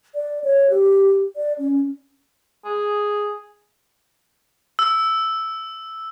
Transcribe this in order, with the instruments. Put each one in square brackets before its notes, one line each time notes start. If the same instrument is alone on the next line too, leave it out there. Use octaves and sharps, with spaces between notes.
[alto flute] D5
C#5
G4
D5
C#4
[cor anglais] G#4
[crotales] E6